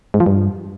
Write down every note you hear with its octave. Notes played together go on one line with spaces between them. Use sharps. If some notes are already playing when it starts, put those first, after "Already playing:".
G#2
F3
G2